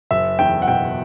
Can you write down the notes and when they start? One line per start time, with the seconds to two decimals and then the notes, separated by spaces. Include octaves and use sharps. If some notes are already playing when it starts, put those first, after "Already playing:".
0.11 F#1 E5
0.39 E2 G5
0.62 F#5
0.67 B2 G5